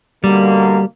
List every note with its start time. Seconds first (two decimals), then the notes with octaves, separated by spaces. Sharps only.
0.24 B2 D3 G3 A#3